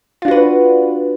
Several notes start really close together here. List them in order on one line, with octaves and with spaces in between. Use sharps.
F4 D4 F#4 B4